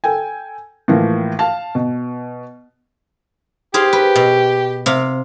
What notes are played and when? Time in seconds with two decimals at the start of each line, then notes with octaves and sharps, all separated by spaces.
0.04 A4 G5 G#5
0.88 A2 E3 F3 A#3
1.39 F5 A5
1.75 B2
3.74 G4 G#4 C5 F5
3.93 B4
4.15 B2
4.86 C3 F5